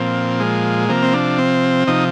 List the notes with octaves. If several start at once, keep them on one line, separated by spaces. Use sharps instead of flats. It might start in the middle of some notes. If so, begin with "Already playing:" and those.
Already playing: A#2 F3 C4
G#3
C3 F3 A#3
C4
D4
C4
C3 F3 D#4